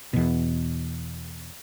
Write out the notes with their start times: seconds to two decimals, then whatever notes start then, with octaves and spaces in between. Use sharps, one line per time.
0.13 E2 B2